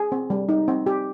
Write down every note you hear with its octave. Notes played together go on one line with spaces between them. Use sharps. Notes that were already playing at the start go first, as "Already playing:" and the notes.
Already playing: G#4
C4
G3
D#4
C4
G4